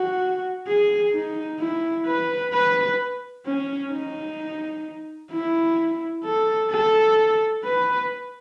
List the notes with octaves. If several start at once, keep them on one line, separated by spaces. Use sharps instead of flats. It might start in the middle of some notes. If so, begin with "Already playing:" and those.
Already playing: F#4
G#4
D#4
E4
B4
B4
C#4
D#4
E4
A4
A4
B4